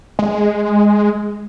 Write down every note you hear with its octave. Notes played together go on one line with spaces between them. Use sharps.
G#3